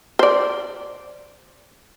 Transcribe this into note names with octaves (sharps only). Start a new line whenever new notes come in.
C5 D5